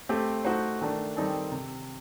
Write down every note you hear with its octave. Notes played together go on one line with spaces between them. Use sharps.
A3 C4 G4
A3 D#4 F#4 C5
D#3 A3 D4
D#3 G3 C4 D#4 A4
C3